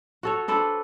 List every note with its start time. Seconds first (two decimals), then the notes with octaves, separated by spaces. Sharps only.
0.23 F#4 A4 C#5
0.48 D4 A4 B4 C5